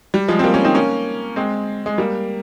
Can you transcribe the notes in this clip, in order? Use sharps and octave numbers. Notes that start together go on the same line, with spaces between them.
G3
F3 G#3
C4
G3 A#3
A#3 C#4
C4 D#4
A#3 C#4
G#3 C4
G#3
G3 A#3